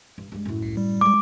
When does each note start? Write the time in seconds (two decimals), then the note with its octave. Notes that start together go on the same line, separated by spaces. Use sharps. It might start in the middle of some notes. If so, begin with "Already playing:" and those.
0.18 G2
0.32 G2 G#3
0.45 F#2 A2
0.62 C2
0.77 G3
1.01 F3 G#3 D6